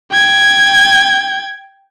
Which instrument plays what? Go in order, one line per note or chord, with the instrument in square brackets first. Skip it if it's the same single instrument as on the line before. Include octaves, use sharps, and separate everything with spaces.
[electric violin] G5 G#6